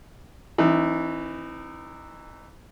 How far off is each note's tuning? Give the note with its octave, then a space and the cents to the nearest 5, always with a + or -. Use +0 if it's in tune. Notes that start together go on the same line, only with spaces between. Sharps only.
E3 +0 C4 +35 D#4 -25